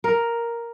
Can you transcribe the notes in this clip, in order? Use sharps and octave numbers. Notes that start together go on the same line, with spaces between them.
A#4